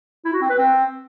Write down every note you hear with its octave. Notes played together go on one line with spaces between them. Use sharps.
E4
F#4
C4
B4
C4